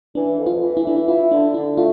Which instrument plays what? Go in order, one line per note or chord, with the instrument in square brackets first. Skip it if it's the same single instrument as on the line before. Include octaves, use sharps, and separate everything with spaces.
[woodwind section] E3 [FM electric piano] D4
[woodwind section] F2
[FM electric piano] F4
[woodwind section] E3
[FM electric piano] E4
[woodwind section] E3 [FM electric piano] D4
[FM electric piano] E4
[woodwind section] E4 [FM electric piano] F4
[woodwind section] D3 [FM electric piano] D4
[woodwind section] D3 [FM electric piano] E4
[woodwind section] A3 [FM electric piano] F4